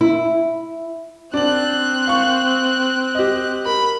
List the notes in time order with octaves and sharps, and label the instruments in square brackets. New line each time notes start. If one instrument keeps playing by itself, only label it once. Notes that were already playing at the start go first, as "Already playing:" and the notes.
[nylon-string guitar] E4
[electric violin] C4 F#6 [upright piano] D4 F#7
[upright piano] F5 C#6
G4 D#5
[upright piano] A#4 [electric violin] B5